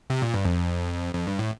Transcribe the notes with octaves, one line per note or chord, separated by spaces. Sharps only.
C3
A#2
G2
F2
F2
G2
A2